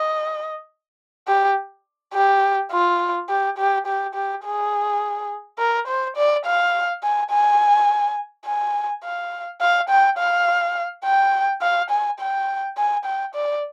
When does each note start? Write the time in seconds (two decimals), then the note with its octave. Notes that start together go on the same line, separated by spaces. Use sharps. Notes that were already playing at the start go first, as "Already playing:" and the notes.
Already playing: D#5
1.28 G4
2.14 G4
2.72 F4
3.29 G4
3.58 G4
3.87 G4
4.15 G4
4.45 G#4
5.59 A#4
5.88 C5
6.16 D5
6.46 F5
7.03 G#5
7.31 G#5
8.46 G#5
9.03 F5
9.61 F5
9.89 G5
10.19 F5
11.04 G5
11.62 F5
11.90 G#5
12.20 G5
12.77 G#5
13.05 G5
13.35 D5